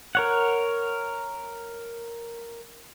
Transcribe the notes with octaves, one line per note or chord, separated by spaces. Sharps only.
A#4 C#5 F#5